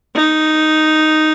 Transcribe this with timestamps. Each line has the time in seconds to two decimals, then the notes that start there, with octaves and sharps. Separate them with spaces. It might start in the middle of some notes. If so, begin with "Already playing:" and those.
0.15 D#4